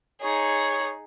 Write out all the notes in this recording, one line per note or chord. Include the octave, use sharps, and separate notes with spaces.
D#4 G#4 C#5